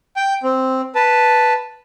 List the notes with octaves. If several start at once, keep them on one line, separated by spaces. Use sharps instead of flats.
G5
C4
B4 A5